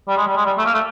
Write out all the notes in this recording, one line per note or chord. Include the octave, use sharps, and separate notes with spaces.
G3
G#3
G3
G#3
G3
A3
A#3
A3